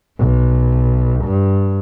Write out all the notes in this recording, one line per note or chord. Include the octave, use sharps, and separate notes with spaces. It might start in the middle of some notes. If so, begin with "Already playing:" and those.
B1
G2